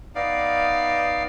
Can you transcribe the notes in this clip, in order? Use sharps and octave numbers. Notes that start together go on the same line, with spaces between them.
B3 D#4 D5 F5